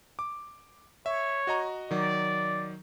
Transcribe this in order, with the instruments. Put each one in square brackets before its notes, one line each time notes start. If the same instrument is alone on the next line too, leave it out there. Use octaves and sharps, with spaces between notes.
[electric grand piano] D6
[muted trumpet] C#5 [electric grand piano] E5
[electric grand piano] F#4 D#5 A#5
[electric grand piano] D#3 F#3 [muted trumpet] D5